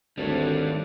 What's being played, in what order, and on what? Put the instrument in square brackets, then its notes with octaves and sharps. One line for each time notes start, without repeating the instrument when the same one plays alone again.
[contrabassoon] G#1 [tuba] D2 [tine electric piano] D#3 C#5 [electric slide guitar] G3 D4